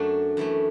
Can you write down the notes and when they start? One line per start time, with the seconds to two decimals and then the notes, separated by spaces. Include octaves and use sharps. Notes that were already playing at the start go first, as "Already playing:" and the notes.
Already playing: F#2 F#3 A3 D4
0.37 F#2 E3 A3